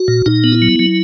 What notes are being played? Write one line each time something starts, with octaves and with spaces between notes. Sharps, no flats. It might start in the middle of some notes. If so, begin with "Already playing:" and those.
Already playing: F#4
A#2
A#2 D#4
B3
E4
F#3
F#3